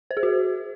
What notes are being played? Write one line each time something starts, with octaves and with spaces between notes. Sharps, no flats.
C5
G#4
F#4